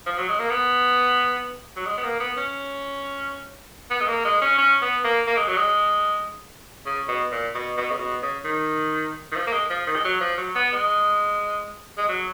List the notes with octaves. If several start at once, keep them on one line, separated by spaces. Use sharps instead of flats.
F3
F#3
G#3
A#3
B3
F#3
G#3
B3
A#3
B3
C#4
B3
G#3
A#3
G#3
C#4
C#4
B3
A#3
A#3
G#3
F#3
G#3
C#3
B2
A#2
B2
B2
C#3
B2
C#3
D#3
D#3
F3
A#3
G#3
F3
D#3
G#3
F#3
F3
F#3
B3
G#3
G#3
F#3